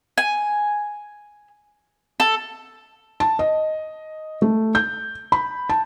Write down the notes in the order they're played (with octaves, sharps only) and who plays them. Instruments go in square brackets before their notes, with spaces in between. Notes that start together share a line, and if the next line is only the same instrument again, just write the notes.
[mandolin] G#5
A4
[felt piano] A5
D#5
A3
G6
B5
A5